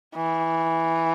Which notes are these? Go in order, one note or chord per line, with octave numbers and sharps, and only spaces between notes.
E3